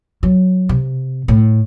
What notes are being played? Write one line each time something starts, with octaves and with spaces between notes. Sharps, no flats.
F#3
C3
A2